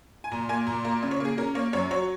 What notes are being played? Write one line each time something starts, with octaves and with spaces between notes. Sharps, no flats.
G#5
A#2 A#5
A#3 G#5
A#2 A#5
A#3 A#5
C#3
C#5
A#3 G#4
C#4 A#4
A#3 C#5
F#2 C#5
F#3 C#5